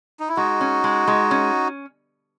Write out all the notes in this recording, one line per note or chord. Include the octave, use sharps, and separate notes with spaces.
D#4
E4
G#3 D#4 F#4
C#4
G#3
G#3
C#4